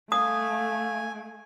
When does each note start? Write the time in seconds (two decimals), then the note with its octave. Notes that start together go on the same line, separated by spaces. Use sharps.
0.12 A3 F5 G#5 D#6